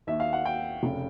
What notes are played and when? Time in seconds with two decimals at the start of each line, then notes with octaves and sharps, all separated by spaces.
0.07 D#2 D#3 E5
0.20 F5
0.33 F#5
0.45 G5
0.83 F1 C#3